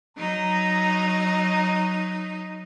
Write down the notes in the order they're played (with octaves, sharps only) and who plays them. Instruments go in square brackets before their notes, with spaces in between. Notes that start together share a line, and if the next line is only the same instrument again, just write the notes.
[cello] F#3 D#4 [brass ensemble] A#5